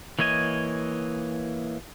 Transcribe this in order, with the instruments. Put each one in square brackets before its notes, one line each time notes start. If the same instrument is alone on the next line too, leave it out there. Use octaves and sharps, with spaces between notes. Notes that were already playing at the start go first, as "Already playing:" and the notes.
[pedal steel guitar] E3 A#3 C#5 D#5 G#5